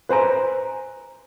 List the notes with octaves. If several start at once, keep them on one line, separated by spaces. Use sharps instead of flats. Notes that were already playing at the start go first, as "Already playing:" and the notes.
B4 C5 G#5 A#5